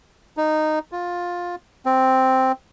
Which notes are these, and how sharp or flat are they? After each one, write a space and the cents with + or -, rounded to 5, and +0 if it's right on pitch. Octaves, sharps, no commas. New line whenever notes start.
D#4 -10
F4 +15
C4 +0